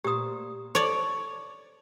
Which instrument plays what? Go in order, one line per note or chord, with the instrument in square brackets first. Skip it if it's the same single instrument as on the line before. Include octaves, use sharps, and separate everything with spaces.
[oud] A#2 C5 [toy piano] G4 D#6
[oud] A4 [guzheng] C#5 D5